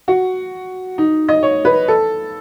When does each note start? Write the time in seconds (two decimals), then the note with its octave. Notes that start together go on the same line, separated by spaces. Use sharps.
0.08 F#4
0.98 D#4
1.29 D#5
1.43 C#5
1.65 B4
1.88 A4